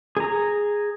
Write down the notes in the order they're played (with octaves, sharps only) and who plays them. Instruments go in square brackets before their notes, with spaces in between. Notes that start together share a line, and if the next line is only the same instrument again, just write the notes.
[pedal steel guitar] G#4 A#5